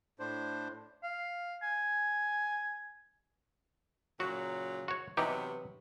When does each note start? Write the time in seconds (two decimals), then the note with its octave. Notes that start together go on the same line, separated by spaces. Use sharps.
0.19 A2 D4 C5
1.03 F5
1.62 G#5
4.20 A#2 C#3 F#3 F#4
4.88 F#4 C#5
5.17 C3 E3 F#3 B3 D#4 G4